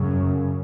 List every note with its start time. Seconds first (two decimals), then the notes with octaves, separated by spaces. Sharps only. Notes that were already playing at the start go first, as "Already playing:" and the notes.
Already playing: F#2 C#3